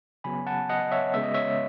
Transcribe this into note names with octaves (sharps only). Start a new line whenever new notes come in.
C#3 F#3 B3 G#5 B5
F#5 A5
D#5 F#5
C#5 E5
C#3 G#3 B3 E5
D#5
C#5 E5